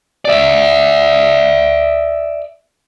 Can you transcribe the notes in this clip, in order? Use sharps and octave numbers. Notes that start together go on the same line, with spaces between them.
D5 E5